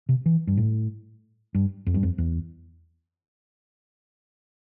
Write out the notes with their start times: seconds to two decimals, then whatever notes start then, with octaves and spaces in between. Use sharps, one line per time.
0.09 C3
0.26 E3
0.47 G2
0.57 A2
1.55 G2
1.86 F2
1.94 G2
2.03 F2
2.18 E2